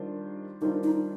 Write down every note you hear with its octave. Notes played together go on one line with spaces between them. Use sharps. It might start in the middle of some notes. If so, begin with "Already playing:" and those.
Already playing: D#3 G3 D4 F4 C5
D#3 G3 D4 D#4 F4 C5
D#4